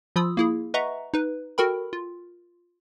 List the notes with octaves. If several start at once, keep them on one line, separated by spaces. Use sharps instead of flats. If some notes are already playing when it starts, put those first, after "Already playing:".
F3 F4 B5 D#6 E6
A#3 E4 G#4
B4 D#5 E5 F#5 A#5 C#6
D#4 B4
F#4 A4 A#4 G5 B5
F4